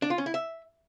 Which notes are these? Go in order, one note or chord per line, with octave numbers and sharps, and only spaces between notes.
D4
F4
C#4
E4
E5